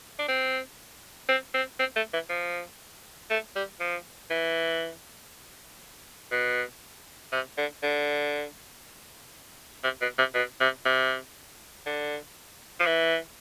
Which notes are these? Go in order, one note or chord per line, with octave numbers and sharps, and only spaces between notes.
D4
C4
C4
C4
C4
A3
E3
F3
A3
G3
F3
E3
B2
C3
D3
D3
C3
B2
C3
B2
C3
C3
D3
F3
E3